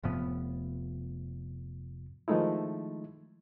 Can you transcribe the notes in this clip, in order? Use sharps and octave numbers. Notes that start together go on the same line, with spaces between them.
F1 A2 F3 B3
D#3 F3 G#3 A3 D#4 E4